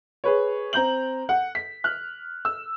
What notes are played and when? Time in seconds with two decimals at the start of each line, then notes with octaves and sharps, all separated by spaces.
0.24 G#4 B4 C#5
0.73 C4 A#5 G6 F#7
1.29 F#5
1.55 B6
1.84 F6 F#6
2.45 E6